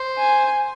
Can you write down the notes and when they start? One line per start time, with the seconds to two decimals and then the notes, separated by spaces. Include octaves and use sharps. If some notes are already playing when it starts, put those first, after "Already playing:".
Already playing: C5
0.18 G#5